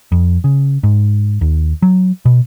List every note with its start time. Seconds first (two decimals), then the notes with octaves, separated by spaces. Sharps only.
0.12 F2
0.44 C#3
0.83 G#2
1.41 D#2
1.82 F#3
2.25 B2